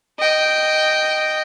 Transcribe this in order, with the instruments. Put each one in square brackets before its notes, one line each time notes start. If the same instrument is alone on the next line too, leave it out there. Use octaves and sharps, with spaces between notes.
[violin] D#5 G5